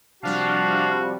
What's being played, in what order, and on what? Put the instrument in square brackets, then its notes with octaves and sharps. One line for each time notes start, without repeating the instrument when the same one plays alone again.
[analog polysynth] C3 F3 G3 [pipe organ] D4 F5 [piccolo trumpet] F#4